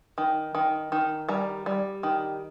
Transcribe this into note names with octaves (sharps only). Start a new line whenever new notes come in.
D#3
D#3
D#3
G3 A#5
G3
D#3